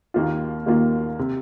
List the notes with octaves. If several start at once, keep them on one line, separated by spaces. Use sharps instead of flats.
D#2 D#3 A#3 F4
D#2 D#3 A#3 F4
C3